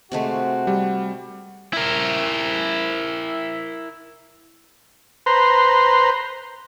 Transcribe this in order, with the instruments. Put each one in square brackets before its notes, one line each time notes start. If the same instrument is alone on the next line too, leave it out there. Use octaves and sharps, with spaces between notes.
[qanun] C3 G#3 A3 [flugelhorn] F#4
[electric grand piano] G3
[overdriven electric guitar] E4 A#4
[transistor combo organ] B4 C5 A#5 C6